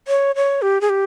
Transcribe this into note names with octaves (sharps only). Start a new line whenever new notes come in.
C#5
C#5
G4
G#4
G4